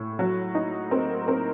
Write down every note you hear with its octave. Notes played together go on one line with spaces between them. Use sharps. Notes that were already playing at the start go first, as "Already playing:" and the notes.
Already playing: A2
F#3
D#4
C4 A#4
C4 A#4